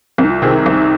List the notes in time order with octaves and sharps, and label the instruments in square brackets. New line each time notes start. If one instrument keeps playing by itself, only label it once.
[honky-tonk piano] C2 [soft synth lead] C4
[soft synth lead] D#4
F4
[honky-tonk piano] C3 D#3 C4 G#4 [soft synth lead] F4
[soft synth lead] D#4
[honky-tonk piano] C2